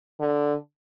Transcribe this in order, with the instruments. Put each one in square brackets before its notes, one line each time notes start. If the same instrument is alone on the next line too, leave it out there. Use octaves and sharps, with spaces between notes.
[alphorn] D3